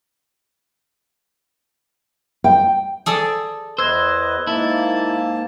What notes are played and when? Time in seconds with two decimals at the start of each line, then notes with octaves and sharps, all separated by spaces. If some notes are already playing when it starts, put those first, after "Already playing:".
2.44 G5
3.06 G#4 A4 D5
3.78 E2 B4 C5 D#5 E6 G#6
4.47 G#2 A#3 E4 A5